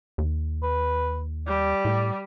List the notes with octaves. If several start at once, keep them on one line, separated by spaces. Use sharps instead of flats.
D#2
B4
G3 D5
A2